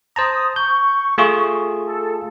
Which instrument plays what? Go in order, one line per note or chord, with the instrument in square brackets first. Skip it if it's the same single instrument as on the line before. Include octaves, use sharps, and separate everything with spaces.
[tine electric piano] C5 A5 A#5 [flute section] D#6
[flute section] C#6 [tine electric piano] G6
[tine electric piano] A3 F4 G#4
[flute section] A4